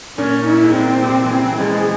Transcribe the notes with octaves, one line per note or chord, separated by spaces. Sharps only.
A#2 C#4
E4
G#2
A#2 C4
C3
E3
C#3
E3
F3 G#3